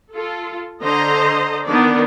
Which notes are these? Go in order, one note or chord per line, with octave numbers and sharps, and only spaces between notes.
F4 A4
D3 C5 D#5 A#5
D#3 B3 D4 D5